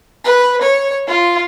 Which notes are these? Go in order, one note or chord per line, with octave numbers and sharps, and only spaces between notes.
B4
C#5
F4